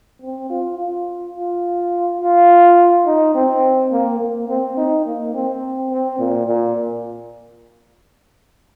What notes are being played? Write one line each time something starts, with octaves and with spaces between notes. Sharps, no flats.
C4
F4
F4
F4
F4
D#4
C4
A#3
A#3
C4
D#4
A#3
C4
C4
A#2
A#2